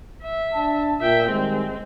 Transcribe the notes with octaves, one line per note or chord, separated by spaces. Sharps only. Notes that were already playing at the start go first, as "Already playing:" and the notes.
E5
D4 A5
A#2 E5 G5
D#3 G3 G#3 C4